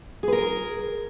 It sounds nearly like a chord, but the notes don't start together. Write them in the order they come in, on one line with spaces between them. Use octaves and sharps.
G#4 B4 A#4